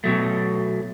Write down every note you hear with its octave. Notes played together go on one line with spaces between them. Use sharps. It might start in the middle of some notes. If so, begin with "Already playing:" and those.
B2 F#3 A3